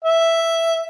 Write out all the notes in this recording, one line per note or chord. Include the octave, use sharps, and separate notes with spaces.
E5